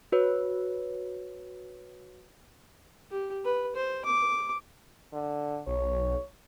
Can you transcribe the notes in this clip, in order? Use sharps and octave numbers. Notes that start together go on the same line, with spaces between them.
F#4 B4 C#5
G4
B4
C5
D6
D3
B1 C#5